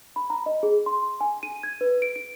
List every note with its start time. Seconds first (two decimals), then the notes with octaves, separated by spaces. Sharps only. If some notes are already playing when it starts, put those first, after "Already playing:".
0.16 B5
0.30 A#5
0.46 D#5
0.63 G#4
0.86 C6
1.21 G#5
1.43 D#7
1.63 G#6
1.81 B4
2.02 D7
2.16 D7